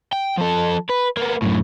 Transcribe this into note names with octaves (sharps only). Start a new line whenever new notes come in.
G5
F3 A4
B4
A#3 B3
F#2 A2